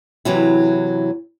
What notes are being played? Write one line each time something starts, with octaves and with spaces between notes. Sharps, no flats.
C3 E3 F#3 E4